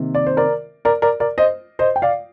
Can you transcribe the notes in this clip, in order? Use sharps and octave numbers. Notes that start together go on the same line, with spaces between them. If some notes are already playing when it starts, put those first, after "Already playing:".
Already playing: C3 D#3 A#3
D5
C5
A#4 D5
A#4 D5
A#4 D5
A#4 D5
C5 D#5
C5 D#5
G5
D5 F5